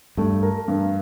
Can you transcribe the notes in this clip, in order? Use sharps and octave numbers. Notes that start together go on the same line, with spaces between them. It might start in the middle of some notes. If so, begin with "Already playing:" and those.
G2 A3
A#4
G2